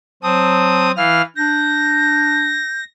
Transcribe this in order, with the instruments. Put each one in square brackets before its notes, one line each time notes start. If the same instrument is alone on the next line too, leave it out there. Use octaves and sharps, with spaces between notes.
[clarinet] F#3 [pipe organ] C4 D#6 [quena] A5
[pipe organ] E3 F6 [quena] F5
[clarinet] D4 [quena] G6 [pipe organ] A#6